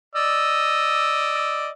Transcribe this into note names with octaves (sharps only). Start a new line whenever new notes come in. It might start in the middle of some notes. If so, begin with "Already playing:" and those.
D5 D#5 E6